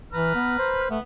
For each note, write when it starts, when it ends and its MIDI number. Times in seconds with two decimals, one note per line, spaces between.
0.13 0.33 52
0.13 0.88 71
0.13 0.88 82
0.13 0.88 89
0.35 0.57 59
0.59 0.90 72
0.90 0.98 57
0.90 1.00 59